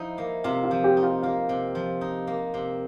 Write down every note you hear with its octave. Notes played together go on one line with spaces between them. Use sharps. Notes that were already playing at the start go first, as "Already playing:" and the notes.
Already playing: F3 D#4 E4 E5
A#3
C3 F4 F5
F4 F5
F3
G4 G5
D#4
F4 F5
A#3 F4 F5
C3
F3
D#4
A#3
C3